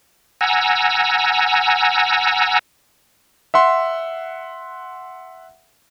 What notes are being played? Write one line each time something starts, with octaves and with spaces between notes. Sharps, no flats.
F#5 G#5 A#5 E6
E5 F#5 C6